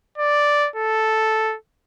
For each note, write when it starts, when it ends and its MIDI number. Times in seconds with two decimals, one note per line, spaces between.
0.18 0.69 74
0.76 1.56 69